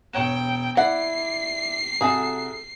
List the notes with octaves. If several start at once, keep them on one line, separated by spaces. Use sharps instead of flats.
E1 C#5 G5 E7
E4 D5 F#5 C7
C2 F#4 G#4 A4